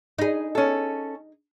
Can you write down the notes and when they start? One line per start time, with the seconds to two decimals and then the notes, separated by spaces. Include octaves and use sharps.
0.18 D#4 G#4
0.55 C#4 A4